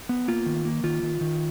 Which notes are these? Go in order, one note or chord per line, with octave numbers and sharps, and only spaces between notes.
B3
A#3 F4
D#3
A#3
D#3 F4
D#3
D#3